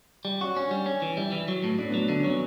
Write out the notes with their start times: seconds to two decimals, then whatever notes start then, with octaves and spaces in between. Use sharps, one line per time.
0.25 G3
0.41 C#4 F#4
0.56 C#4 D4
0.71 G3
0.86 C#4
1.02 E3
1.17 G3 E4
1.32 E3
1.48 F#3
1.64 A2
1.78 A2 D4
1.89 B3
1.94 F#3
2.09 D3 D4
2.20 C#4
2.24 F#3
2.30 B3